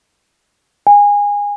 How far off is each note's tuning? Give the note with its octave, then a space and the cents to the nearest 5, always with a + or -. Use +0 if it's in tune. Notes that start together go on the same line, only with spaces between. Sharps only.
G#5 -25